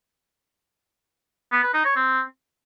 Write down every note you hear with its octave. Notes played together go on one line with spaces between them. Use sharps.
B3
B4
D#4
C#5
C4